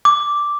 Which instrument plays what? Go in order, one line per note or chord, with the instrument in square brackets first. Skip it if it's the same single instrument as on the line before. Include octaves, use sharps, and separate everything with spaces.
[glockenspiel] D6